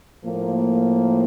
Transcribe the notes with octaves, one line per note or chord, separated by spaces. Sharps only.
A2 F3 A#3